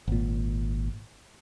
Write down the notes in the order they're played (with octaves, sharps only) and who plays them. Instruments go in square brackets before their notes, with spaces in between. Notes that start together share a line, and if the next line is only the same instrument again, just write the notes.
[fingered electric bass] G#1 A#2